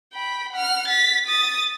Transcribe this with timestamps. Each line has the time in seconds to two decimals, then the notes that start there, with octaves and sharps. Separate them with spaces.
0.13 G5 B5
0.52 F#5 F6
0.88 A6 B6
1.26 D#6 A6